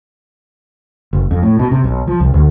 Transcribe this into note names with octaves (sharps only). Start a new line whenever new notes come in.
F#1
F2
A2
B2
C3
B1
F3
C2
D2